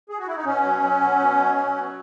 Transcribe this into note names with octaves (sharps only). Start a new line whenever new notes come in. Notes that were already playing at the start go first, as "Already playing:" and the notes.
G#4
F#4
E4
D#4
B2 C#4
F#3
F#3
B2
B2
F#3
F#3
B2